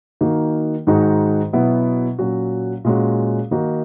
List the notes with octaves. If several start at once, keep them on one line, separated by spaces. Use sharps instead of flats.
D#3 A#3 D#4 F#4
G#2 D#3 G#3 D#4 F#4
B2 F#3 B3 E4
A#2 F#3 C#4 F#4
A#2 G#3 C#4 F#4
D#3 A#3 D#4 F#4